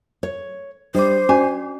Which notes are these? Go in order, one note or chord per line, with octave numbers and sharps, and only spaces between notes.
C#5
G3 D4 C5 D6
C#4 F#4 G#5